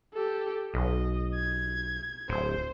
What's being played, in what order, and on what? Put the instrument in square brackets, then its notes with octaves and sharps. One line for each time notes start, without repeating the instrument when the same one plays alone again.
[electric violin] G4 A4
[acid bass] B1 [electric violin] D#5
[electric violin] G#6
[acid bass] D1 [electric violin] C5